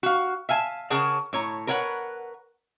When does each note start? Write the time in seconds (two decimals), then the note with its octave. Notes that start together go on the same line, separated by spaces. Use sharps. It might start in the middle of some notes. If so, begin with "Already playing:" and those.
0.03 F#4 F5
0.49 E5 F5 G#5 A5
0.90 C#3 G#4 A#4 C#5 F#5 A5
1.33 A2 C#5 A#5
1.67 A#4 B4 C#5 F5 F#5